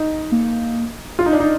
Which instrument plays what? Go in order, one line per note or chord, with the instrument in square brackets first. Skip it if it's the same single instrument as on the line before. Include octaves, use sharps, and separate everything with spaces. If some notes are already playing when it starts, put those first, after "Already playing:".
Already playing: [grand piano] D#4
[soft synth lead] A#3
[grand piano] F4
D#4
D4
D#4